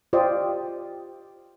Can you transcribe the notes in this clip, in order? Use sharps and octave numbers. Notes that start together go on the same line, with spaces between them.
F4 G4 C5 D5 D#5 G5